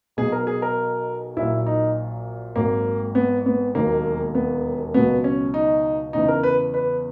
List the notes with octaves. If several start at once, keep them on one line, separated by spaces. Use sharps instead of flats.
B1 B2 F#3 G#4
A#4
G#4
A#4
A#1 A#2 F#3 E4
D#4
G#1 G#2 F#3 A#3
B3
B3
E1 D#2 D#3 F#3 A#3
B3
C#2 B2 F#3 B3
C#4
D#4
E2 C#3 E3 D#4
A#4
B4
B4